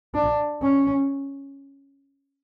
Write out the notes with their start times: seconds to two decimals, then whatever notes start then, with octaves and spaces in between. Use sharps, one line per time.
0.14 D4
0.62 C#4